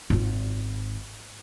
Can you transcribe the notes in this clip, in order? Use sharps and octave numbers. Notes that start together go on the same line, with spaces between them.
G#1 F4